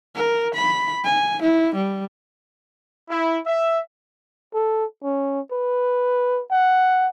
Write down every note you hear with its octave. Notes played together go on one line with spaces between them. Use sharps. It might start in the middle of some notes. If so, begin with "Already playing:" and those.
A#4
B5
G#5
E4
G3
E4
E5
A4
C#4
B4
F#5